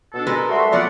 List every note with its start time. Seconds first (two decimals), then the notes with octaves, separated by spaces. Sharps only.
0.13 B2 D4 A4
0.27 G#3 A#4 B4
0.48 G3 F#4 A4 E5 C6
0.72 F3 F#3 A3 B3 D5 F#5